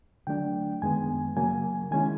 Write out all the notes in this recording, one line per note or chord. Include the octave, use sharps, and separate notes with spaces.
D3 F#3 A3 D4 G5
F#2 D#3 G#3 B3 G#5
C#3 F#3 A#3 G#5
D#3 G#3 C#4 E4 G#5